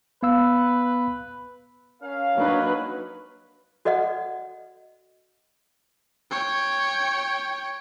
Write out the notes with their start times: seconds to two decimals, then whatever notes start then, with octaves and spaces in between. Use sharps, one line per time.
0.23 B3 B4 F5 E6
2.02 C#4 A#4 F5
2.37 F#3 A#3 D4 D#4 B4
3.85 F#4 A4 D5 D#5 F#5
6.31 C#5 G5